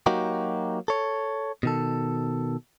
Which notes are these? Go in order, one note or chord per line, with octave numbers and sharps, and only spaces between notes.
F#3 A#3 D#4 F#4 G4
A4 C#5
B2 D#3 A4